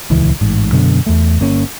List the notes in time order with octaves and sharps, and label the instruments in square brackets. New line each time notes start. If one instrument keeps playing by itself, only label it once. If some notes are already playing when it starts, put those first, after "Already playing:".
[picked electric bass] D#1 C#2 E3
A1 G#2
F#2 B2 D3
E2 A3
G1 A#3 C#4